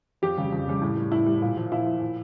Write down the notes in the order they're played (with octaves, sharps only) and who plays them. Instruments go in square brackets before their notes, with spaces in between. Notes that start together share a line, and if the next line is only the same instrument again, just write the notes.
[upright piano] F2 G4
C#3 G3
F2
C#3 G3
A2
G3
A2 E4
G3
A#2
F3
A#2 E4
F3
A#2